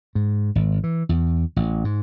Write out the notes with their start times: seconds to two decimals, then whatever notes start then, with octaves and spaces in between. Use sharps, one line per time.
0.15 G#2
0.55 G#1
0.84 E3
1.09 E2
1.56 A1
1.85 G#2